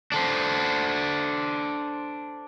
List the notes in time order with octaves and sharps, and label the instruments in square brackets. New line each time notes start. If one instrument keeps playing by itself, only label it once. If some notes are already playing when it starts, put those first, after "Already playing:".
[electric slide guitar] D4 A4 C5